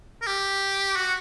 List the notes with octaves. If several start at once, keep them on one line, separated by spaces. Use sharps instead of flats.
A#4
G4
F#4